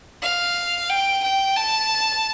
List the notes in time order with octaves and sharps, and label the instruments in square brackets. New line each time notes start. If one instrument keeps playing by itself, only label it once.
[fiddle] F5
G5
G5
A5